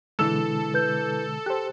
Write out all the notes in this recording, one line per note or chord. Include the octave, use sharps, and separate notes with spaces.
B2 D3 E3 G#3 A4 E6 E7
B4 G6
G4 C5 F#6